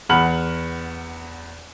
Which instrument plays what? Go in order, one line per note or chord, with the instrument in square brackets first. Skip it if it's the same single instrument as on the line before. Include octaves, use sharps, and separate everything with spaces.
[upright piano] E2 F#5 B5 F6 F#7